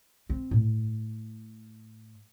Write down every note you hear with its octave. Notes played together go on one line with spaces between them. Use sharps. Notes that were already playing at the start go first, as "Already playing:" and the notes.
C4
A2